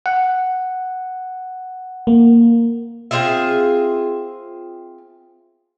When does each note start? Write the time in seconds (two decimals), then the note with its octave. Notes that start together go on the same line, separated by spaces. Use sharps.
0.06 F#5
2.07 A#3
3.11 C4 F4 G#4 E5